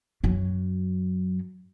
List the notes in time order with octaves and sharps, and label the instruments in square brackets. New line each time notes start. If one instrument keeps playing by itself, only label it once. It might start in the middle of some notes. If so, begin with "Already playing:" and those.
[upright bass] F#2 F#3